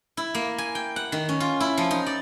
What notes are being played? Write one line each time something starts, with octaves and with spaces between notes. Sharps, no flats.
E4
A#3
G#5
G5
F#5
D#3
C#4
F4
E4
F3
D#4
D5